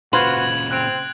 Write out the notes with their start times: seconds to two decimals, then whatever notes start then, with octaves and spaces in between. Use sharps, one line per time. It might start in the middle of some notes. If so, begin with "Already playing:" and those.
0.13 A#2 C#3 F4 F#4 B4 C5 G#6 F#7
0.71 C4 F#6 D7 F7